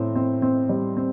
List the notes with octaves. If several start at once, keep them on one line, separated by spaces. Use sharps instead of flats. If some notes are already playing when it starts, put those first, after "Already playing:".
Already playing: A2 C4
C4
C4
G3
C4